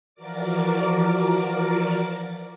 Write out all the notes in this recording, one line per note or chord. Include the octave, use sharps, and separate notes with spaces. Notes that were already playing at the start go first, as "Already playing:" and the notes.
E3 F3 F#4 A#4 D5 D6